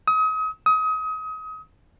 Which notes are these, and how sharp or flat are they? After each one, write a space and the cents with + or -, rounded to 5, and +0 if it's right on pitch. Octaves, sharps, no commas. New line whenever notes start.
D#6 +35
D#6 +30